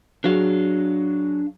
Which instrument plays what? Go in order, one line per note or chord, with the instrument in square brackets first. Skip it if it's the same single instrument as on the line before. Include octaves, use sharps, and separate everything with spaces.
[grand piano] F#3 F#4 G#4 [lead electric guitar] D4 F5